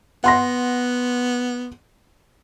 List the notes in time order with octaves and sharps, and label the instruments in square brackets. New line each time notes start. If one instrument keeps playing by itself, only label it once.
[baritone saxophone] B3 [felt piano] F#5 C6 A#6